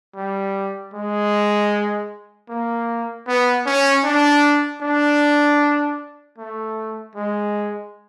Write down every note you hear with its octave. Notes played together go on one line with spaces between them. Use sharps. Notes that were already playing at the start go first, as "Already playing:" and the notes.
G3
G#3
A#3
B3
C#4
D4
D4
A3
G#3